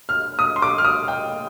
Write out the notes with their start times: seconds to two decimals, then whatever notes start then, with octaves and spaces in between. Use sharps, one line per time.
0.09 F6
0.39 D#6
0.56 C6
0.62 D6
0.78 F6
0.85 D#6
1.08 G5